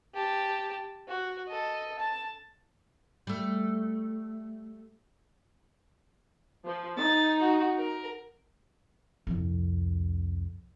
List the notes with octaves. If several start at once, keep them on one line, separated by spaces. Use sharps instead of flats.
G4 A5
F#4
A4 D#5
A5
G3 A3
F3
D#4 A6
F#4
A#4
C2 F2